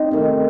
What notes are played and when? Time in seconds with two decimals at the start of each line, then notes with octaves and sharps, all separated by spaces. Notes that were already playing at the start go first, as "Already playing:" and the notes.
Already playing: C4 D#4
0.11 C3 D#3 A3